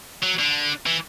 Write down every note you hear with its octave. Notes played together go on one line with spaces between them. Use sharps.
F#3
D3
E3